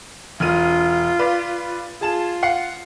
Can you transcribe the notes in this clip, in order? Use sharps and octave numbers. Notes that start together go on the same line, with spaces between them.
E1 F4 F6 D#7
B4 D5 F5
F4 G#4 A5 E7
F5 F#5 C7